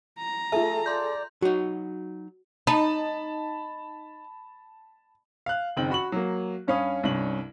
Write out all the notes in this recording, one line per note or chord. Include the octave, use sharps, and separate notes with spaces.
A#5
A3 F4 G#4 A4 E5
D5 C6 G6
F#3 D#4 F#4
D#4 A5 B5
F5 F#6
F#1 D#3 C4 G5 F#7
F#4 B5 C#6 F#7
F#3 A#3
G2 C#4 C#5 F5 B5 D#6
C2 G2 C#4 F#7